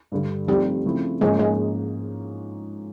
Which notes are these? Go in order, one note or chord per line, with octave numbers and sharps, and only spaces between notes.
G2 D3 G3
F3 G3 A3 C4 D#4
C#3 F3 A3 C4 E4
G#2 F3 G#3 A#3 C#4
G#3